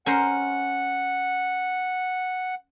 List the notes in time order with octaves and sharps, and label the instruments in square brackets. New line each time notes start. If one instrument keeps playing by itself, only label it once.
[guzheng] C#4 A#4 C5 [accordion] F#5